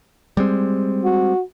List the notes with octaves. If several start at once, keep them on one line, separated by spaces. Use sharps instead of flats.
G3 G#3 C4
F#4